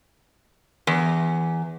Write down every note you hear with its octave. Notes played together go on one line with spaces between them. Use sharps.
E2